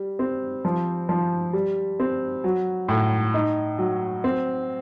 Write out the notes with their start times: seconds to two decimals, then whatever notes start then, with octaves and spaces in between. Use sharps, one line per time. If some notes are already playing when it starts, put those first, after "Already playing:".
Already playing: G3
0.19 C4
0.65 F3
1.09 F3
1.53 G3
2.00 C4
2.44 F#3
2.88 A2
3.34 D#4
3.78 F#3
4.24 C4